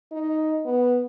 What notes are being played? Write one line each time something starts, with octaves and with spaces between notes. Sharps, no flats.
D#4
B3